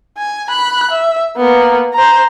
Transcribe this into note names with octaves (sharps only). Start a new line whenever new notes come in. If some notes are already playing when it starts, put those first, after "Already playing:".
G#5
B5 F#6
E5
A#3 B3
C5 A#5